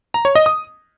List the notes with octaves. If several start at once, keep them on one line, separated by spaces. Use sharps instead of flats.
A#5
C#5
D#5
D#6